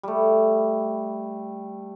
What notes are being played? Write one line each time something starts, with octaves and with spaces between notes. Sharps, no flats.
G3 A3